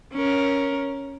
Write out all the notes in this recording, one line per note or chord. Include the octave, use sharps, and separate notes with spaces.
C#4 A#4